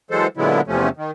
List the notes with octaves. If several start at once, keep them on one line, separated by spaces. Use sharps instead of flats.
E3 F#3 G#3 A4 C5
A#2 D3 F#3 G#3 B3 E4
E2 C3 F3 A3 C#4
D#3